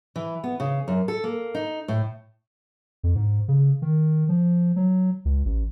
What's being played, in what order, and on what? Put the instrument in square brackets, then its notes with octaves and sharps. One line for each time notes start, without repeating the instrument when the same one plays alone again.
[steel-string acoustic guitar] E3
B3
C#3
F#2
A4
A#3
D#4
A2
[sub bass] F2
G#2
C#3
D#3
F3
F#3
C#2
A1